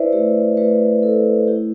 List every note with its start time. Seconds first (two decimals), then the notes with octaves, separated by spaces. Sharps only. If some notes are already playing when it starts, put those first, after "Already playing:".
Already playing: E4 B4 C5 D5 E5
0.13 A3 G4 B4
0.57 A3 G4 B4
1.02 E4 A4
1.48 E4 G4